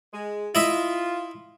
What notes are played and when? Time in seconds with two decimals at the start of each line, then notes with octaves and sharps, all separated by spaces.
0.13 G#3
0.55 E4 F4 D#5 E5